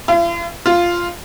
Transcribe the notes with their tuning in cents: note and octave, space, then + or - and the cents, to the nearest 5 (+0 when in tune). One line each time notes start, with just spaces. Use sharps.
F4 -45
F4 -5